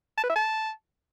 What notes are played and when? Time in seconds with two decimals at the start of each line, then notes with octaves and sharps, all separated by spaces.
0.17 A5
0.24 B4
0.30 E5
0.36 A5